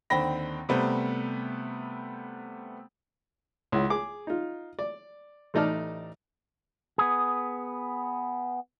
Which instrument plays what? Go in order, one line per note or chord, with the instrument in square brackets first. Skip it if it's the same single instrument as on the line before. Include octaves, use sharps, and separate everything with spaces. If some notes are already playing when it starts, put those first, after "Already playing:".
[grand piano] D#2 D3 C4 G5 B5 A#6
C3 G3 A3 B3 C5
[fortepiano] C#2 E4 F#5
G#4 D6
D#4 F4
D5
A1 A3 D#4 D5 A5 F6
[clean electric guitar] B3 G#4